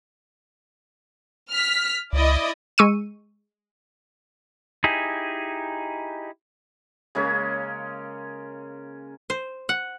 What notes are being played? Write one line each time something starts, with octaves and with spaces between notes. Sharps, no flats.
F6 B6
C#2 E4 D5 D#5
G#3 C#6 E6 C#7 D#7
D#4 E4 G4 G#4
C#3 G#3 A#3 C#4
C5
F#5